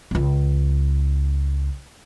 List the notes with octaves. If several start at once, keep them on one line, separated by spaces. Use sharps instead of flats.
C#2 C#4